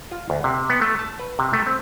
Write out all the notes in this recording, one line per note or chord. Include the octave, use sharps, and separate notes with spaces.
F4
D2
C3
B3
A3
A5
B4
C3
A3
C4